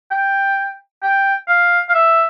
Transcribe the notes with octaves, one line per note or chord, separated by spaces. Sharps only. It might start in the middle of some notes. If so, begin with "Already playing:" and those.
G5
G5
F5
F5
E5